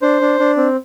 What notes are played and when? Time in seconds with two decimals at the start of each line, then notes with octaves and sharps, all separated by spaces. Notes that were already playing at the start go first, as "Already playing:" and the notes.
0.02 D4 C5
0.21 D4
0.40 D4
0.57 C4